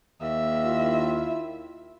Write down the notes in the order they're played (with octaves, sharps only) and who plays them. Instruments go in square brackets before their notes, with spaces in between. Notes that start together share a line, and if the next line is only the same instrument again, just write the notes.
[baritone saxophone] D#2 [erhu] E5
[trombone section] D#3 E4 F4